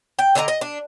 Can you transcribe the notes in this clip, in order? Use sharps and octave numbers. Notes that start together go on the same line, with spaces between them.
G5
D3 D#5 G5 A#5
D#5
D4